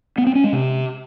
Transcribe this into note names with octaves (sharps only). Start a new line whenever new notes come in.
B3
C4
C#4
G#3
C3